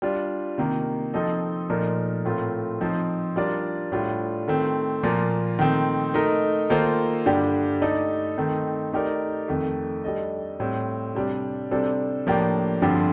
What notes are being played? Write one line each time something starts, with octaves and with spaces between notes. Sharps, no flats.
G3 D4 F4
C3 D#3 A#3
F3 C4 D#4 A4 D#5
A#2 F3 A3 D#4 A#4
A2 A3 C4 F4 A#4
F3 C4 D#4
G3 D4 F4 A#4 D5
A2 G3 D4 F4
D#3 A3 C4
A#2 F3 A#3 F4
D#3 A3 C4
A3 D#4 A#4 D#5
D#3 A#3 F4 A4 C5
G2 D3 G3 D4 G4
A3 D#4 A4 D5
D#3 A3 C4 D#4
A3 D#4 G4 A#4 D5
F2 D#3 A3
G3 D4 A4 D#5
A2 G3 C4
C3 G3 D4
C3 G3 D4 A4 C5
A2 F3 A#3 D4 G4
G2 D3 F3 C4 G4